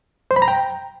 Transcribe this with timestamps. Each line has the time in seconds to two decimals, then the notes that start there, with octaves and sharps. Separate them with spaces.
0.31 C5
0.36 B5
0.42 A#5
0.48 G5